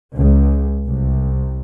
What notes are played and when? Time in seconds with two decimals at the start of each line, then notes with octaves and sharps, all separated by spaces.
0.14 C#2
0.86 C2